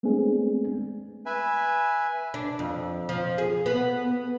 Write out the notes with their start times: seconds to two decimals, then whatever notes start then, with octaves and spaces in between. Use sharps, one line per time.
0.03 G#3 A3 B3 C4 D4 G#4
1.26 B4 E5 G#5
2.34 D4
2.59 F2
3.09 F3
3.38 G#4
3.66 B3